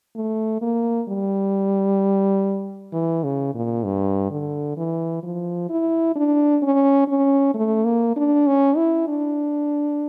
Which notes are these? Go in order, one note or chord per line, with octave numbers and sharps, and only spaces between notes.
A3
A#3
G3
E3
C#3
A#2
G2
D3
E3
F3
E4
D4
C#4
C#4
A3
A#3
D4
C#4
E4
D4